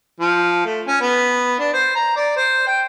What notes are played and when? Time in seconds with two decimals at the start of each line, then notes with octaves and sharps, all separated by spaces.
0.20 F3
0.66 A3
0.88 C#4
1.01 B3
1.59 D4
1.73 C5
1.95 A#5
2.16 D5
2.36 C5
2.67 G5